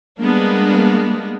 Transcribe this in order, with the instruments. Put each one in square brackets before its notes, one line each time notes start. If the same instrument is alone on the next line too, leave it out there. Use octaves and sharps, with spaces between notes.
[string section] G3 G#3 A#3 B3 D4